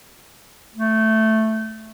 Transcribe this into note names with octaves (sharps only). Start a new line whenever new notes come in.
A3